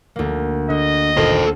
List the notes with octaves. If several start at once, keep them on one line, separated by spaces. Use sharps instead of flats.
D2 A#3
D3 D#5
F#1 A#2 D#3 A4 C5